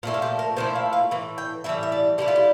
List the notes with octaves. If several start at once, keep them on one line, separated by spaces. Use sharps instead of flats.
A#2 F3 A3 E4 F4
F4
G4
A#4
A#2 F3 A3 E4 C5
F5
F5
A2 E3
G5
A2 E3 G3 E5
E5
D5
D3 G3 C4 E4 G4
F4
G4